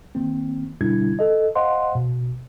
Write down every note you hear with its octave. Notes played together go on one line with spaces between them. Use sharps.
D#3 A#3 C4
B2 D3 G3 D4 E4 G#6
A4 D#5
C5 D#5 F5 F#5 C6
B2